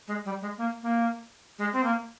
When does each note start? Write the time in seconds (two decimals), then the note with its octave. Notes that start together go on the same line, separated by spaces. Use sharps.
0.08 G#3
0.25 G3
0.41 G#3
0.58 A#3
0.83 A#3
1.58 G#3
1.73 C4
1.84 A#3